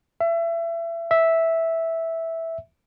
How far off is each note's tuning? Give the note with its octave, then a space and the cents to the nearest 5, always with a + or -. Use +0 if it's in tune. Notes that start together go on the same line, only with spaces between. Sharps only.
E5 +30
E5 -5